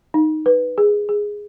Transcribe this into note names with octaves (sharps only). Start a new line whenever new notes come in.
D#4
B4
G#4
G#4